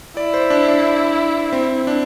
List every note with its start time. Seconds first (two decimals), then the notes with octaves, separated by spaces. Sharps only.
0.17 E4 D5
0.34 C5
0.50 D4
0.68 D4
1.53 C4
1.87 D4